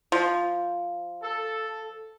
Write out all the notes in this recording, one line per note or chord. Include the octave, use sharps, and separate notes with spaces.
F3
A4